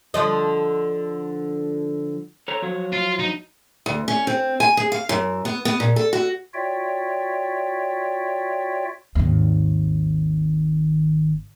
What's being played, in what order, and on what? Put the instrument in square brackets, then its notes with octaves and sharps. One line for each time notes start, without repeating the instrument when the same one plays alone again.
[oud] D3 F3 D#5
[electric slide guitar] A4 C#5 A#5
F3 F#3 C#5
[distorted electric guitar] F4
D#4
[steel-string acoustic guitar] D2
C#4
C4
G#5
G#4
F5
F#2
B3
B3
A#2
A4
F#4
[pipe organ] F4 F#4 C#5 D5 E5 G5
[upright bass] G#1 D#2